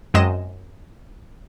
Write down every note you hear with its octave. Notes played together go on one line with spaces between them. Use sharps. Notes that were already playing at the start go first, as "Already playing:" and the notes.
F#2 G#3 C4 D#5 E7